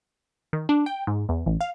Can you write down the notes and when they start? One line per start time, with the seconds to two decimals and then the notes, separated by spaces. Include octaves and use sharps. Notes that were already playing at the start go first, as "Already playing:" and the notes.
0.53 D#3
0.69 D4
0.86 G5
1.07 G#2
1.29 E2
1.46 A1
1.61 F5